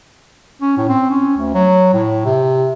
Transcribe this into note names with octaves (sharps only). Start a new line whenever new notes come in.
C#4
A2
C4
C#4
D2
F#3
A2
C3